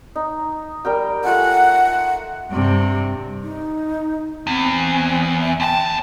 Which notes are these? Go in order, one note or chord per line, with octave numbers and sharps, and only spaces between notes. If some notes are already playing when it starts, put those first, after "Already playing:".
D#4
G3 A#4 G5
A3 F4 F#5 G#5
G2 C3
D#4
E2 C4
E5
D#2 G5 A5